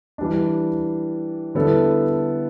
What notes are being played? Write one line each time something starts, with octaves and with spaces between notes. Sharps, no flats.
E3 G3 D4
D3 G3 B3 E4 A4